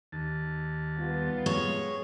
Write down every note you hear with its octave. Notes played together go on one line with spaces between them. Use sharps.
D#2 A5
G3 B3 F4
G#3 C#5